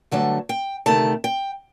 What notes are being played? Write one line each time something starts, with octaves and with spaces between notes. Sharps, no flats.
G2 D3 F#3 A3 A5
G5
D2 C3 D#3 A3 A5
G5